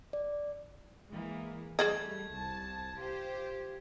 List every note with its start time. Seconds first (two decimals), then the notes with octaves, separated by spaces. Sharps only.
0.13 D5
1.12 E3 G#3 A#3
1.79 G3 A3 G#4 D5 D#5 G#6
2.30 C2 A5
2.97 F4 G4 C5